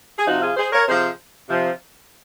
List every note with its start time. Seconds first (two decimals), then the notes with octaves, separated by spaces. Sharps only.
0.18 G#4
0.26 C3 F3 D#4 F#4
0.41 F4 G#4
0.57 G#4 C5
0.72 A#4 C#5
0.87 C3 F3 G#4 C5
1.49 C3 F3